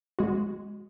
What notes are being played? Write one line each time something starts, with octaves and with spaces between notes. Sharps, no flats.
G#3 F#4